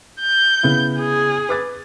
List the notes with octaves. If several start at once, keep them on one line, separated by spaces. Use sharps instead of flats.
G6
C#3 B3 E4
G#4
B4 D6 A6